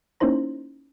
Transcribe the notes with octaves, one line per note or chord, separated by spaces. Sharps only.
A#3 C#4 D#4 E4 C5 A#5